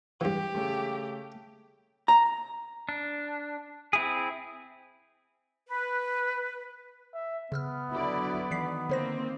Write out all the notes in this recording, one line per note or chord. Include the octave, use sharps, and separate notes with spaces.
G2 E3 G4
C#3 A3
A#5
D4
C4 E4 G#4
B4
E5
C#3 B3 E6 F6
D3 F#3 E4 D5
D#3 E3 B6 C7
D3 A#3 C4 C5 A#6